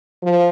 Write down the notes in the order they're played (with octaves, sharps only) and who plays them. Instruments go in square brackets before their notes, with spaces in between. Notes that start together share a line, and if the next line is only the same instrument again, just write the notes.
[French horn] F3